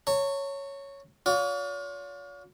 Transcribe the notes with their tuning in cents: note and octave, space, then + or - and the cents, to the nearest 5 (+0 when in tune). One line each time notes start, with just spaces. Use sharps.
C#5 +0 A#5 -45
F4 +35 C#5 +45